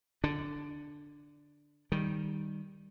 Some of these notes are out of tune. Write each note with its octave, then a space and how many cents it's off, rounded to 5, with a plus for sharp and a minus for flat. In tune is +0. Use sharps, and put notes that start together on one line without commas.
D3 +0 D4 +0
D#3 +0 G3 +0